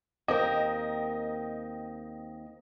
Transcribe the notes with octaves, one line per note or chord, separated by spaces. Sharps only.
D#2 C4 A#4 D#5